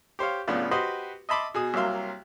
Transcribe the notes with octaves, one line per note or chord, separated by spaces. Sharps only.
G4 C5 C#5 F5
B1 A2 C#3 B3 D4 F4
F#4 G4 B4 C5 D#5
D#5 E5 A5 B5 C6 D6
B2 G#4 D#6
C2 F#3 A#3 E5 F5 C6